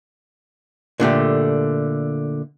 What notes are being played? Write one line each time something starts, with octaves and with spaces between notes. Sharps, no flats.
A#2 D3 A3 G4